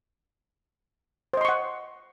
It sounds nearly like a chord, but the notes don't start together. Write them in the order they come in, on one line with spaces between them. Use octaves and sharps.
C5 D#5 C6 C#6 F#5